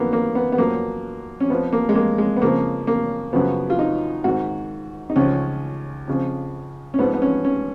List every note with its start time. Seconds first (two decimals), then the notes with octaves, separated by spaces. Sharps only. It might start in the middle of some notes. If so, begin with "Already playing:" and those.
Already playing: F#2 D#3 A#3 B3
0.13 A#3
0.35 B3
0.52 B3
0.58 F#2 F3 A#3
1.40 C#4
1.50 F2 F3 B3
1.73 A#3
1.89 G#3
1.95 A#3
2.18 G#3
2.37 B3
2.42 F2 C#3 F3 A#3
2.87 A#3
3.33 F#2 C#3 F3 B3
3.70 F4
3.79 D#4
4.24 G#2 D#3 F#4
5.10 D#4
5.16 C#2 C#3 F3 C#4
6.08 F2 C#3 F3
6.94 C#4
6.99 G#2 F3 B3
7.14 B3
7.22 C#4
7.45 C#4